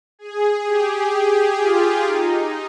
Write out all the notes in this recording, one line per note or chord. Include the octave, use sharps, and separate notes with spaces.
G#4
G4
G4
F4
D#4